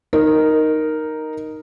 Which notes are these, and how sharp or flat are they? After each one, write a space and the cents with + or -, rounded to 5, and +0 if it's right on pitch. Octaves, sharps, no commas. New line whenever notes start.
D#4 +0 A#4 +0